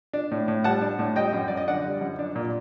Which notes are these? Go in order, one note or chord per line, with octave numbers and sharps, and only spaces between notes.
D4
A2
A2
G3 F#5 A5
D4
A2
G3 D#5 G5
F#2
F#2 D5
D#5
D3 D5 F#5
G3
F#2
D4
A#2